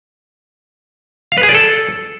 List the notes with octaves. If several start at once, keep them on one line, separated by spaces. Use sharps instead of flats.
F5
B4
G#4
D5
A4